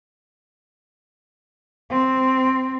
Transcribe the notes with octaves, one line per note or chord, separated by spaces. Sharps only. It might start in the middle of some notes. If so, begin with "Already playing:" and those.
C4